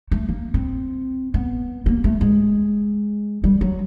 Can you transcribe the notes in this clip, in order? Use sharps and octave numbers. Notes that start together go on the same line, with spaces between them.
A3
A#3
C4
B3
A#3
A3
G#3
G3
F#3